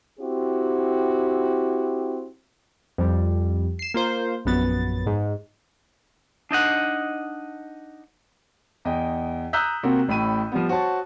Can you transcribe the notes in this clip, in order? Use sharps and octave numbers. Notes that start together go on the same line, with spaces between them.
C4 E4 F#4 G4
F2 G3
C7 E7
A#3 F4 C5
A#1 F#2 B3 A6
G#2
D4 D#4 D#5 F#5
E2 D#5 G5
A#5 D#6 E6 F#6 G6 B6
C3 A#3 C4 F#4
A1 A2 B5 D#7
F3 G3 B3
F#4 C5 C#5 A5 C#6